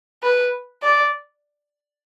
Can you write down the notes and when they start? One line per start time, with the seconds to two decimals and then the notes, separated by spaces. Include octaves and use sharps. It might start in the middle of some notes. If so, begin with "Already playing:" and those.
0.23 B4
0.82 D5